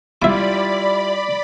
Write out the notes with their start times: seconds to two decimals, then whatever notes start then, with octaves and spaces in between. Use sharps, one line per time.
0.22 G3 E4 F4 D5 E5 B5 D6